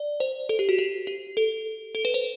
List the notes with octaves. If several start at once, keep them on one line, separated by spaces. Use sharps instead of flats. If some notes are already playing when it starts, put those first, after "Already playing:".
Already playing: D5
C5
A4
G4
F#4
G4
G4
A4
A4
B4
C5